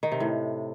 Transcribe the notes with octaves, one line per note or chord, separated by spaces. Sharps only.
D#3
C3
A2